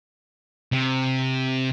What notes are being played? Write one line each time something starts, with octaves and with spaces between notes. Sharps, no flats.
C3